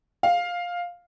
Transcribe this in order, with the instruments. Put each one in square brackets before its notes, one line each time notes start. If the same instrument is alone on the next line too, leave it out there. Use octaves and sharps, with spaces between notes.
[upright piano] F5